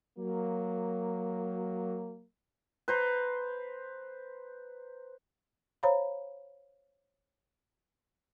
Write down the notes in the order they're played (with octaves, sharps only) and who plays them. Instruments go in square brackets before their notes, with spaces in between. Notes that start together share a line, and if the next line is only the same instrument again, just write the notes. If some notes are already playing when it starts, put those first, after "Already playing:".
[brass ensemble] F#3 A#3
[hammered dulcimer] B4 C5 A#5
[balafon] C5 C#5 F5 A#5 B5